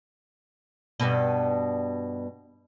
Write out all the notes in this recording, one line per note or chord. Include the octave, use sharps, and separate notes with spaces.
G2 B2